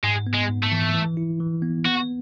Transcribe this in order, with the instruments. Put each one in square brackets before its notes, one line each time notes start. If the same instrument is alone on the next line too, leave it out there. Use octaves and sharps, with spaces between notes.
[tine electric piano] G#2 [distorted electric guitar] G#3
[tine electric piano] B3
[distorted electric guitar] G#3
[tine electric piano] G#2
[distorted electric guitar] A3
[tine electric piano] E3
E3
E4
E3
B3
[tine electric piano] B3 [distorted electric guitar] F#4